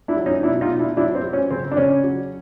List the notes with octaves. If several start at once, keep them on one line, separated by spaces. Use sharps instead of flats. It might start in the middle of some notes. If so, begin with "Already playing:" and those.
D4 E4
F#3
C#4 D#4
B2 D4 E4
D#4 F4
B2
D4 E4
F#3 D4 E4
C4
F#3
C#4
C#3 C4
D4
C#3 C#4
F#3